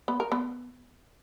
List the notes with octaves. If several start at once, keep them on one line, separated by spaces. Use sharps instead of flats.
B3
A#4
B3